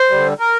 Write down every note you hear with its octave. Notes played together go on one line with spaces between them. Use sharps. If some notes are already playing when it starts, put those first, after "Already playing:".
Already playing: C5
D3 G3
A#4